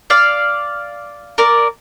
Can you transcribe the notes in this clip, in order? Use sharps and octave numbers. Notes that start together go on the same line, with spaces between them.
D5 F5
A#4 D5